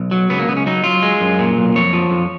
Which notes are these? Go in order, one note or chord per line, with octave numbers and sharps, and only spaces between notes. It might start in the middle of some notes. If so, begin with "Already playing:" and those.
Already playing: B1
F#3
C#2 B3
A#3
C#2 B3
C#4
F#3 D#4
F#3 F4
G#3
F#2
A#2
B1
F2 C#5
F3
F2